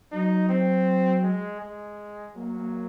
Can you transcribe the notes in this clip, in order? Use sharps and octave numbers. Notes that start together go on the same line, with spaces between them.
F#3 D#4
C4
G#3
G#3
F#3 A#3
A#3